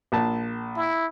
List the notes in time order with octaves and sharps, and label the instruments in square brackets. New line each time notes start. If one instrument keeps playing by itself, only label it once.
[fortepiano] A#1 A5
[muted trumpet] E4